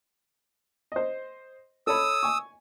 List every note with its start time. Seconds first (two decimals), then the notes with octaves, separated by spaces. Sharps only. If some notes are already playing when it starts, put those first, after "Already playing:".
0.92 C5 D#5
1.87 A4 C#5 B5 D#6 E6
2.23 G#5 C#6